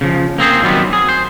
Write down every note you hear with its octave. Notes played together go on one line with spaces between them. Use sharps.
C#3 F3
A#3 C4 G#4 C5
D#3 F#3 G3 B3 C4
G#4
C5